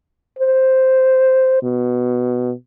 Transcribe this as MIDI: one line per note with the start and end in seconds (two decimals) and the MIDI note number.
0.39 1.58 72
1.63 2.52 47